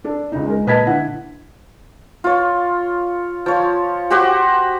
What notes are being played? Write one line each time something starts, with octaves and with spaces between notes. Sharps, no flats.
D4 A4
C#2 D#4
G#3 A#4
A#2 B4 D#5 A5 G#6 B6
D3 E4 F#5
F4 C#5
F3 C#5
F#4 G4 C5 F#5